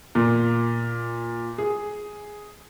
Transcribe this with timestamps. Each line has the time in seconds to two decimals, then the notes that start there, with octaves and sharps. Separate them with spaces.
0.15 A#2
1.58 G#4